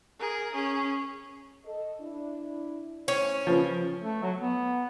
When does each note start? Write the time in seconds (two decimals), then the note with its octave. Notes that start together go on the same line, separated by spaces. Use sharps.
0.20 G#4 A#4
0.54 C#4 G#4
1.65 A4 D#5
2.01 D4 E4
3.08 A2 C#4 E4 C5
3.47 C#3 F3 B4
4.01 A3
4.23 F#3
4.39 B3